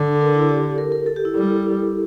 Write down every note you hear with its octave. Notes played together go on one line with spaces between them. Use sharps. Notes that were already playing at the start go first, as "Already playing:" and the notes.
Already playing: D3 D4
A4
A#4
E4
G4
A4
A#4
A#4
A4
G4
E4
G3